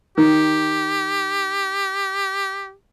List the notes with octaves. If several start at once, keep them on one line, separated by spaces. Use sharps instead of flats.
D#3 G4